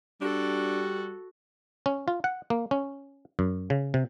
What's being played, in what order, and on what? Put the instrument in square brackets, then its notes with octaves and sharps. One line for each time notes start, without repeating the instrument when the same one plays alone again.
[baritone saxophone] G3 [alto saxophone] D4 [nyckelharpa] F#4 A4
[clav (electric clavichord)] C#4
F4
F#5
A#3
C#4
F#2
C#3
C3